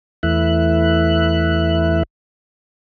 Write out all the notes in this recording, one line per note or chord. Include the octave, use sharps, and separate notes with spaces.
E2 E3 A3 E4 E5 F#6